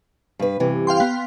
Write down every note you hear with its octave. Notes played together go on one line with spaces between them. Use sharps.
G2 B4
G2 C3 E3
F5 G5 C6
B3